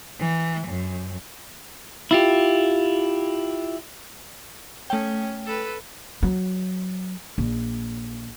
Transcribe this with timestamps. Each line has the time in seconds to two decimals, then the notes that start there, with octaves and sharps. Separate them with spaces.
0.19 E3
0.68 F#2
2.11 E4 F4 G4
4.90 A3 C#4 G5
5.46 A4 B4
6.23 F#3
7.38 A#1